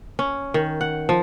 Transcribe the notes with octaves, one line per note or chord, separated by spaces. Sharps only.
C#4
D#3
F#5
F3